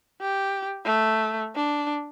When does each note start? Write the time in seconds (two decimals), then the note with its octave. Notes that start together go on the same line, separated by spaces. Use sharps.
0.21 G4
0.85 A3
1.56 D4